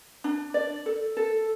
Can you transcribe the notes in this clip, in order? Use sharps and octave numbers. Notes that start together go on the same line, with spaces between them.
D4
D5
A4
A4